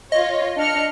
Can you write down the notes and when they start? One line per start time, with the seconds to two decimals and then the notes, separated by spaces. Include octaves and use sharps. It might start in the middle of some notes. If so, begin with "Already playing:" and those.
0.12 F4 C#5 D#5
0.57 D4 F6 C#7